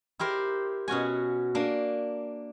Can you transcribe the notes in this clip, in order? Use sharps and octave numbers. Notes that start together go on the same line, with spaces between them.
E4 G4 A#4 C5
B2 C#4 F#4 G#5
A#3 D4